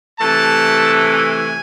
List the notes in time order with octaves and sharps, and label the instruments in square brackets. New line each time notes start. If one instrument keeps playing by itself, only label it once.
[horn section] C3 E3 A3 A5
G#5